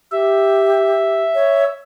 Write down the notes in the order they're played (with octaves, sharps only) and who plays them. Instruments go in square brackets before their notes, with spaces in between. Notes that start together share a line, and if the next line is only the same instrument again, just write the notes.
[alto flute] G4 [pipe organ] E5
[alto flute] C#5